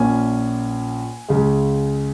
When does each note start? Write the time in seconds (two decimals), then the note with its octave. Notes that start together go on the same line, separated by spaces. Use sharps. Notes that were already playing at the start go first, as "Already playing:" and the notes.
Already playing: A#1 A#2 A#3 C#4 G#5
1.29 C#2 C#3 G#3